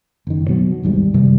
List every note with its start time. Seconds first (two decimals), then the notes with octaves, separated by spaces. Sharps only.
0.27 F#1 D#3
0.48 B2 F#3
0.83 G#1 D#2 G#2 G3
1.14 F#1 C3 D#3 G3